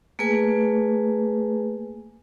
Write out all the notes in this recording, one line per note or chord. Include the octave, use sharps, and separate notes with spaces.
A3 A#3 G#4 B4 G#5